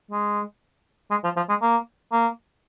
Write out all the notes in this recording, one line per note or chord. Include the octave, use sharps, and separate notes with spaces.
G#3
G#3
F3
F3
G#3
A#3
A#3